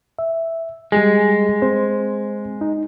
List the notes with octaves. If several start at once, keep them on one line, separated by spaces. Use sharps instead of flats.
E5
G3 G#3 G4 G#4
C4 C5
D#4